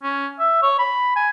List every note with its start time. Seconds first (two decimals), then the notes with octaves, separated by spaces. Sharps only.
0.03 C#4
0.39 E5
0.62 C#5
0.79 B5
1.16 G#5